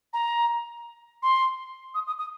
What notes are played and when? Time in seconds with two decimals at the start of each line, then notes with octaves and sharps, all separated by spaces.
0.13 A#5
1.22 C6
1.94 D#6
2.07 D#6
2.18 D#6